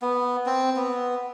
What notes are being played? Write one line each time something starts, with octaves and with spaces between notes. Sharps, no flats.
B3
C4
B3